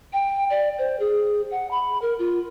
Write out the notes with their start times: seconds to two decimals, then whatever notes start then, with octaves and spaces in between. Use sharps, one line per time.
0.13 G5
0.50 D5
0.78 C5
1.00 G#4
1.51 F#5
1.71 B5
2.02 A#4
2.19 F4